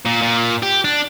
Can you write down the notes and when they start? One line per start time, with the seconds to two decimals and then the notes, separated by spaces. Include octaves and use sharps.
0.05 A#2
0.22 A#2
0.63 G4
0.85 D4